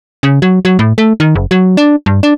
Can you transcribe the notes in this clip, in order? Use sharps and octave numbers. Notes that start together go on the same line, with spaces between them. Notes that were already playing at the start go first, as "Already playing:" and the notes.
C#3
F#3
F#3
A2
A3
D#3
F#1
F#3
D4
G2
D4